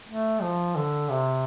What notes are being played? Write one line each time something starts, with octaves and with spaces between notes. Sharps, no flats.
A3
F3
D3
C3